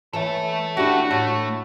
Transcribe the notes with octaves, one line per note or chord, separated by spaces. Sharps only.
E3 A4 C#5 E5
D4 E4 F#4 G4
A2 A3